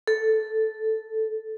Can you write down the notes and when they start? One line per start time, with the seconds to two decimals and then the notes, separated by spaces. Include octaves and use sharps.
0.08 A4